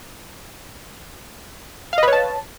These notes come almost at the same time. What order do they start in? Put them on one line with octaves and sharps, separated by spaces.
F5 D#5 B4 C#5 A5